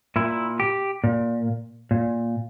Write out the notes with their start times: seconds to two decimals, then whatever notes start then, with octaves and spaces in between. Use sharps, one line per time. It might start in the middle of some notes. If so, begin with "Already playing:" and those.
0.16 A#2 E4
0.60 G4
1.04 A#2
1.91 A#2